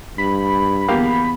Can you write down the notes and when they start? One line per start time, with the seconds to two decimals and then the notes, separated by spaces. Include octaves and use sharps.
0.18 G2 B5
0.88 E2 A#3 B3 G4 F5